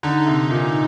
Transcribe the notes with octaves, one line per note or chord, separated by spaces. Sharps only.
D3 D#4
C3
A#2